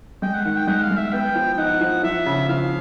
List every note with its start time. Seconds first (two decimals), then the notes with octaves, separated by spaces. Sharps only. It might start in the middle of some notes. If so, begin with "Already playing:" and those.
0.22 G#3 G5
0.34 F#5
0.45 D#3 F#5
0.56 G5
0.67 G#3 F#5
0.83 F5
0.90 G#3
0.98 E5
1.13 B3 G5
1.35 F3
1.54 G5
1.58 D#4 F#5
1.81 F3
2.03 F3 E5
2.26 C#3
2.49 F3 F5